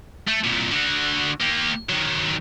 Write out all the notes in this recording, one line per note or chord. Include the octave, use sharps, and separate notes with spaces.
A3
C2 A#2
D3 F#4
A#3 G4
D#3 F#3